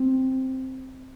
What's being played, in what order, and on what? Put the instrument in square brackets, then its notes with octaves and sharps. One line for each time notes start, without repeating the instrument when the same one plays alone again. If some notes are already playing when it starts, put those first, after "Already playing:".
Already playing: [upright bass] C4